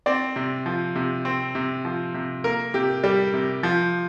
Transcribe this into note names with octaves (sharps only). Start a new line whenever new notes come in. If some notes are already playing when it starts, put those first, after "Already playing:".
C4 D5
C3
F3
C3
C4
C3
F3
C3
A#3 A#4
C3 G4
G3 G4
C3
F3